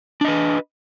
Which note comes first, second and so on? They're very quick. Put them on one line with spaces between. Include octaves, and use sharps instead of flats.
D4 D#5 B4